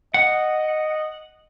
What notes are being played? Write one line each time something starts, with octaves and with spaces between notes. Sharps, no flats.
D#5 F#5